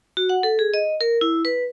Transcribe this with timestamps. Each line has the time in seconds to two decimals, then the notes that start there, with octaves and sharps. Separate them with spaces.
0.17 F#4
0.29 F#5
0.43 A4
0.59 G#4
0.74 D#5
1.01 A#4
1.21 E4
1.45 B4